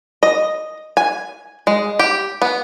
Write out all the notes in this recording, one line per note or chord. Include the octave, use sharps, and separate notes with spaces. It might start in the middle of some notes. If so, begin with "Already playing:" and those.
D#5
G#5
G#3
G4
B3